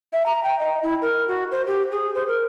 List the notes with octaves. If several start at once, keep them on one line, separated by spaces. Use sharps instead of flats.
E5
A#5
G5
D#5
E4
A#4
F#4
C5
G4
G#4
C5
A#4